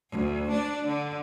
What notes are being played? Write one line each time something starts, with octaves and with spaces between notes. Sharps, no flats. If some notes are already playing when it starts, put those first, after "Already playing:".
D2
D4
D3